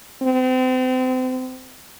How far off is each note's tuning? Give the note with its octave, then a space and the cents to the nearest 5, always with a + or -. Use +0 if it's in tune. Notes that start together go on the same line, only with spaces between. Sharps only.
C4 -35